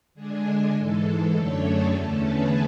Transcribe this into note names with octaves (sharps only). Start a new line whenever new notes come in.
D3 G#3 D4 G#4
G#2 E3 G#3 A4
A4
F#2 D3 A3 D4 A4 C#5
G#4
E2 D3 A3 C#4 A4
G#4 B4